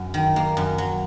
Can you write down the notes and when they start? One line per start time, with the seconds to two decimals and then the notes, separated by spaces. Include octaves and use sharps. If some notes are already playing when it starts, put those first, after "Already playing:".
Already playing: F#2
0.14 D#3
0.36 A#3
0.57 F#2
0.78 F#3